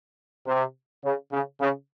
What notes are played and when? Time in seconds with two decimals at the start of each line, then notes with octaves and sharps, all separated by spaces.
0.46 C3
1.04 C#3
1.32 C#3
1.60 C#3